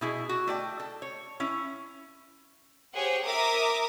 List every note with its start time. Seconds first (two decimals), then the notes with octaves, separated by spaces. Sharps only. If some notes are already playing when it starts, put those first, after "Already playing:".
0.01 B2 E4 G#4
0.29 F#4
0.47 A3 D5 G5
0.80 A4
1.02 C#5
1.40 C#4 E4
2.93 G4 G#4 C5 C#5 F#5 G5
3.24 A#4 E5 A#5 D6 D#6